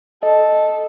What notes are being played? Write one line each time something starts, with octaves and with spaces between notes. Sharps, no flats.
A4 D#5